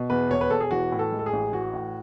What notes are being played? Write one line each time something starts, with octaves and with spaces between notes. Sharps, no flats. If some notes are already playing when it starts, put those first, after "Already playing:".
Already playing: B2
E2 B4
E1 C#5
B4
E1 A4
G#4
E3 F#4
A2
A4
G#3
A4
G#4
A1
E3 F#4
A2